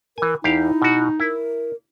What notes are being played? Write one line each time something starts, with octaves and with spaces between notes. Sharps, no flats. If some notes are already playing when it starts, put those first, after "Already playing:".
E3 A#4 G#5
E2 D#4 E4 G4 F5
B2 F#4
E4 A#4